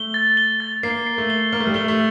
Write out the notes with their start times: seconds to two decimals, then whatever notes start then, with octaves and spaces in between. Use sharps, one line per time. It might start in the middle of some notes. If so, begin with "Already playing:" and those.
Already playing: A3 G7
0.14 A6
0.37 G7
0.60 A6
0.83 A#3 C7
1.07 C7
1.18 A3
1.30 G7
1.53 A#3 F6
1.60 A3
1.67 G3
1.74 A3 G7
1.88 A3